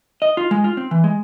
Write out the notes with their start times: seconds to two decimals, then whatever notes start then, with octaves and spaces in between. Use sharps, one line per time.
0.22 D#5
0.37 F4
0.51 G#3
0.64 F4
0.77 C4
0.91 E3
1.04 G#3